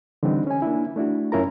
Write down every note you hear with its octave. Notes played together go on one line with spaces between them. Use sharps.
D3 E3 G3 C4 D4 D#4
C#4 G#5
A#3 D4 E4
A3 D4 E4 F#4
F#2 C#4 E4 F4 A#4 A#5